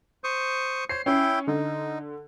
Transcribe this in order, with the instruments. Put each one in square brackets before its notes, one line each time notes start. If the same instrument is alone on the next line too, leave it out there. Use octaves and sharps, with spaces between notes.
[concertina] C5 C#6 D#6
[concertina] C5 C#5 [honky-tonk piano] C7
[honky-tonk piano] C#4 [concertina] E4 G5
[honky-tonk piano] D3 [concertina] D#4